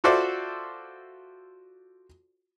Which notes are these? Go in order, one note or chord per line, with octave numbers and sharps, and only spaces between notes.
F4 F#4 A4 C5 D5 E5